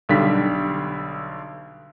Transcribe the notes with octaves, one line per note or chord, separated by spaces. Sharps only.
B1 D3 G3 B6